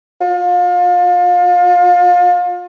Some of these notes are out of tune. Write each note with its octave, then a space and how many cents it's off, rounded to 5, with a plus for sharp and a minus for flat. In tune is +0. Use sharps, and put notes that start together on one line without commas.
F4 +30